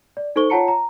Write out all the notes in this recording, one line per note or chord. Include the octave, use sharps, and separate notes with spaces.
D5
D#4 A4 C5 C#6 G7
F4 C#5 F#5 A5 A#5 C#7
A#5